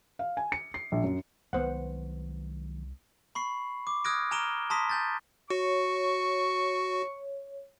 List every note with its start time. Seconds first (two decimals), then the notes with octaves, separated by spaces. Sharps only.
0.19 F5
0.37 G#5
0.52 C#7
0.74 C7
0.92 A#1
1.04 F#2
1.53 C2 D#3 F#3 G#3 B3 C5 F#5
3.35 B5 C#6 C7
3.87 D6
4.05 D#6 F6 F#6 G#6 A#6 D7
4.31 G#5 A#5 F6 D7 E7 G7
4.70 A5 A#5 C6 D#6 A#6 B6
4.89 G#5 G6 A6
5.50 F#4 C#5 C#6